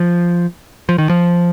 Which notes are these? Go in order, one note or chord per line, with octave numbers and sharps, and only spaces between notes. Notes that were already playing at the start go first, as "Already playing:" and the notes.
Already playing: F3
F3
D#3
F3